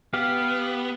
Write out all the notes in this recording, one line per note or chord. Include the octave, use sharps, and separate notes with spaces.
B3 G4 F5